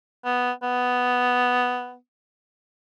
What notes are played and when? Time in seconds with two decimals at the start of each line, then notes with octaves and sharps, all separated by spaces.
0.25 B3
0.63 B3